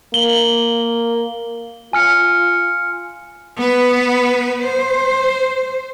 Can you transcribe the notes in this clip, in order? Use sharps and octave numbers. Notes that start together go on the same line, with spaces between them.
A#3 F#7 G7
F4 G#5 F6 C#7
B3 B4
C5